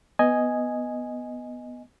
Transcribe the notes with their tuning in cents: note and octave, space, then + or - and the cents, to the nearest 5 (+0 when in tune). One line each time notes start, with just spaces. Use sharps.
B3 +0 D#5 +0 G#5 +0